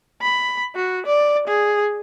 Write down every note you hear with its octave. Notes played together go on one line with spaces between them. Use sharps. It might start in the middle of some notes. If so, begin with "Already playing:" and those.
B5
F#4
D5
G#4